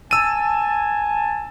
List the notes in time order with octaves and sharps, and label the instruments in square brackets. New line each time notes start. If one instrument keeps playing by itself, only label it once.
[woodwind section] G#5 A5 [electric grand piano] E6 D#7